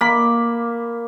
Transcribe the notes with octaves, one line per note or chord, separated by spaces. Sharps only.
A#3 B5